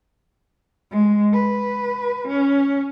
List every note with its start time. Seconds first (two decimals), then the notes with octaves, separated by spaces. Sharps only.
0.91 G#3
1.33 B4
2.28 C#4